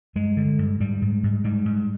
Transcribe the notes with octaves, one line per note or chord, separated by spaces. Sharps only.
G2 G#3
D3
G2
G#2 G3
G#2
G#2
G#2 G3
G#2